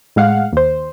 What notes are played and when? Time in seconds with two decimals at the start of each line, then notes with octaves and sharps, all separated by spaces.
0.16 A2 G#3 F5 F#5
0.52 D#2 C5